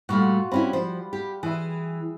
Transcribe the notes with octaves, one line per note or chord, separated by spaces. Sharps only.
A#2 G3 A3 F4 F#4
G3 C4 C#4 E4 B5
F3 C5
G4
E3 G#4 E5